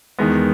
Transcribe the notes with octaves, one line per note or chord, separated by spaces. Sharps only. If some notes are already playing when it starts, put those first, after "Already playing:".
E2 D#3 G#3 B3